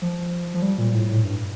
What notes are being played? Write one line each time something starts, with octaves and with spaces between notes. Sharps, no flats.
F3
F3
G3
A#2
A2
A2
G2